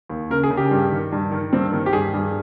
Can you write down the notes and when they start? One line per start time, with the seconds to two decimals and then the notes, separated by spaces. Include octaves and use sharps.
0.09 D#2
0.30 C#3 A#4
0.43 G#4
0.51 C#3
0.57 G4
0.71 G2
0.92 D#3
1.12 G2
1.32 D#3
1.53 G2 C4
1.72 D#3
1.86 G4
1.93 G2 G#4
2.13 G2